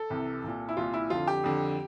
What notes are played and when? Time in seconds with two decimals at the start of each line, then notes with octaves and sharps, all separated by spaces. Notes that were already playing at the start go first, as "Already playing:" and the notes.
Already playing: A4
0.10 C2 C3 E3
0.44 C2 A#2
0.69 E4
0.77 C2 A#2 F4
0.94 E4
1.10 F2 D3 F4
1.27 G4
1.44 F2 D3